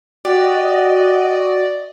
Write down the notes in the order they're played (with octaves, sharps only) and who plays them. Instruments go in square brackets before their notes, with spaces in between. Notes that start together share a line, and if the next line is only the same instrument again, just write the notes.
[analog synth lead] F#4 [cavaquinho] G4 [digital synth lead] D5 [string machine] D#5